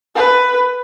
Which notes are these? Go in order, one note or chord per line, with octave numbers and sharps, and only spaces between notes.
B4